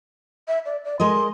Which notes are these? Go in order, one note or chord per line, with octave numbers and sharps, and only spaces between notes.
E5
D5
D5
G#3 A#4 D#5 C6